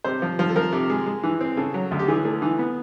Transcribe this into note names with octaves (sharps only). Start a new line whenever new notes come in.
C3 C5
F3
F3
A4
F3 A#4
C3
G#3
G#3
E3
C4
C#3 A4
F#3
D2
G4
E3 G#4
A3
E3
B3